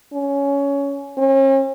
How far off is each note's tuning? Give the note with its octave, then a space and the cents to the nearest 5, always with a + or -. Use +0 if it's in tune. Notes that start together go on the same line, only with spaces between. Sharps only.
C#4 +15
C#4 -40